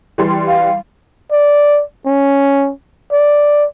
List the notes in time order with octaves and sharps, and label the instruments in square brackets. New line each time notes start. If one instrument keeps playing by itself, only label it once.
[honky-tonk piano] E3 G3 C6
[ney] F5
[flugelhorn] D5
C#4
D5